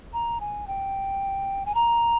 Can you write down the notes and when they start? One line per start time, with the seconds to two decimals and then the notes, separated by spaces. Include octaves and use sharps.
0.13 A#5
0.40 G#5
0.67 G5
1.65 G#5
1.75 A#5